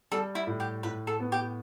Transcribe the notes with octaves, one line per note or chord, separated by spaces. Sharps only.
G3 A4
E4
A2
G4
A2 B4
A4
B3
G4